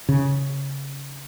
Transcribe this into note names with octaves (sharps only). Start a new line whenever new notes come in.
C#3